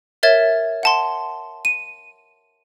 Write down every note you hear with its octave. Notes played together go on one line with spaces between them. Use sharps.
A#4 C#5 E5 G#6 A6 E7
F#5 A5 C6
D#7